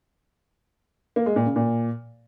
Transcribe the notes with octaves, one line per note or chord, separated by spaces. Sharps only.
A#3
G#3
A#2
C#3
A#2